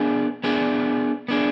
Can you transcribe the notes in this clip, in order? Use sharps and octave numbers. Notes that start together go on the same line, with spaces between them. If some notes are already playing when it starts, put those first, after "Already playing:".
Already playing: B3 D4 G#4
B3 D4 G#4
B3 D4 G#4